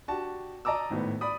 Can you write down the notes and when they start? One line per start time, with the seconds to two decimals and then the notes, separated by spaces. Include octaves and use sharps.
0.08 D4 F#4 G4 A5
0.65 D5 D#5 A5 A#5 D6 E6
0.90 G#1 A2 B3
1.21 D5 B5 D#6